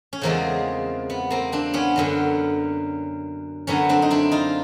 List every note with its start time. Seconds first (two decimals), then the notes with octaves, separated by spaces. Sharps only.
0.13 C#4
0.21 E2 C#3 F3 G#3 A#3 C4
1.10 B3
1.31 A#3 C4
1.52 C4 D4
1.74 B3 C#4
1.96 F#2 D3 F#3
3.67 F#2 D3 F#3 B3 C#4
3.89 C4 D4
4.02 D#4
4.11 D4 E4
4.32 D#4 F4